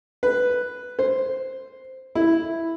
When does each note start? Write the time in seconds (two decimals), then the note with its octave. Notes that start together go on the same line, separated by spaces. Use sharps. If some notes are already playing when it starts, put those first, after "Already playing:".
0.23 B4
0.99 C5
2.15 E4